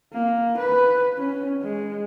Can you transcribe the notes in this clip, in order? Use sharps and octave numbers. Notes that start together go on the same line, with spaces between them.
A#3
B4
C#4
G#3